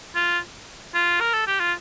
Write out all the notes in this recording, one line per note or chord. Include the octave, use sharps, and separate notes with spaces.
F4
F4
A#4
A4
G4
F4